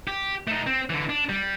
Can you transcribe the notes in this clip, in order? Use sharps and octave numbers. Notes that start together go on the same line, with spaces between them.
G4
A3 D#4
C4
D3 E3
D4
G3